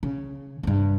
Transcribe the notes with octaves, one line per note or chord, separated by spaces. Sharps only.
C#3
G2 C3